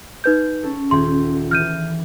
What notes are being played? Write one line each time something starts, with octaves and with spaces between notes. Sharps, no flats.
D#4 B4 G6
C#4 A4
D#1 G5 C6
E3 F6 G6 D#7